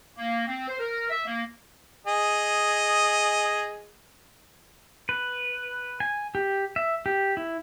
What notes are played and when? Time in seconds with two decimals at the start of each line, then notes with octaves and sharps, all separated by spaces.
0.17 A#3
0.46 C4
0.68 C5
0.79 A#4
1.10 E5
1.26 A#3
2.06 G#4 D#5
5.09 B4
6.00 G#5
6.35 G4
6.76 E5
7.06 G4
7.37 E4